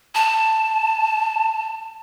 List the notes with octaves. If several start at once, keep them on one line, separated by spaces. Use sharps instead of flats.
A5